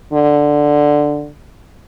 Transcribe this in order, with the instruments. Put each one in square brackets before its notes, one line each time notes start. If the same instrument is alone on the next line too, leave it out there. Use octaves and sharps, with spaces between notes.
[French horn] D3